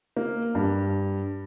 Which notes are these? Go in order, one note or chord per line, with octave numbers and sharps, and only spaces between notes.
A#3
G2